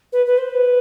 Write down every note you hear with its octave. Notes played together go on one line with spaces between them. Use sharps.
B4
B4
C5
B4